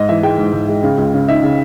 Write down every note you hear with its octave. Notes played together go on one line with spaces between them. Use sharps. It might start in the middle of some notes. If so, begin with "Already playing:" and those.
Already playing: G#2 D#5
E3 E5
G#3 G5
G#2
G#2
G#3
C#3
C#2
C#3
D#4 E5
C#3